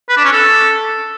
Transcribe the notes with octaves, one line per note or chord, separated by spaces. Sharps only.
B4
D4
C#4
A4